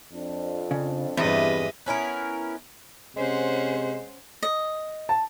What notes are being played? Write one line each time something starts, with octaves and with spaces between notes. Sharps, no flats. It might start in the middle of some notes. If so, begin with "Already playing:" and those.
F2 D4
C#3
E2 G2 C4 E4 G4 G#4 B4 D#5
B3 C#4 E4 A#4
C3 G#3 C#4 C5 F#5
D#5
A5